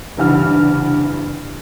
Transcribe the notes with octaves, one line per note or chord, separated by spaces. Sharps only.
F#1 C2 G2 E3 F#5 F6